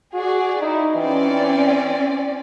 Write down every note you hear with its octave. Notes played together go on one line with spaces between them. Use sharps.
F#4 G#4 D5
D#4 E4
E3 C4 C#4 D5